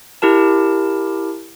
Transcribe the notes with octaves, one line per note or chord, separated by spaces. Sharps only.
E4 G4 A#4 A5